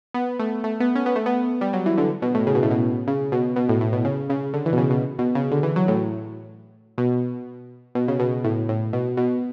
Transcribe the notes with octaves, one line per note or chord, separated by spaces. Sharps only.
B3
A3
A3
B3
C#4
B3
A3
B3
G3
F#3
E3
D3
B2
A2
C#3
B2
A2
B2
C#3
B2
B2
A2
A2
B2
C#3
C#3
D3
E3
B2
C#3
B2
B2
C#3
D3
E3
F#3
A2
B2
B2
C#3
B2
A2
A2
B2
B2